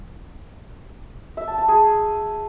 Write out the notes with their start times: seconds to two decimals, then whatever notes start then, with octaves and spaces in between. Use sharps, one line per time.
1.37 E5
1.48 A5
1.58 A5
1.68 G#4